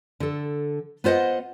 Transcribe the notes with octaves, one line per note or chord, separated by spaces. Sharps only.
D3 A4
B3 F4 C5 D#5 F#5